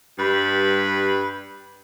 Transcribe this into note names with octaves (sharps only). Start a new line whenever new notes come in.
G2 G3 B4 B5